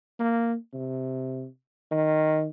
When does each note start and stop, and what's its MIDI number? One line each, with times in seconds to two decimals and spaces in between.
0.19 0.55 58
0.74 1.46 48
1.92 2.49 51